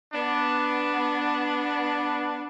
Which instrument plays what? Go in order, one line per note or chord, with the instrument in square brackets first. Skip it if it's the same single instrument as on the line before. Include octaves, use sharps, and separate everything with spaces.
[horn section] B3 D4